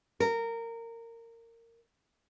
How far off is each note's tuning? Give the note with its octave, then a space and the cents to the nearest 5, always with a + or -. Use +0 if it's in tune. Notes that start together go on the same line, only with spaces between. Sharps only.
A#4 -20